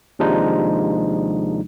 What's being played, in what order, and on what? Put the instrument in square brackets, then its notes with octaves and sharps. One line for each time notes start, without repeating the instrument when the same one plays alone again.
[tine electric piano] D#2 C3 F3 G#3 D4 D#4